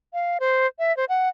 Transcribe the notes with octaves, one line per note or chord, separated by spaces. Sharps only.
F5
C5
E5
C5
F#5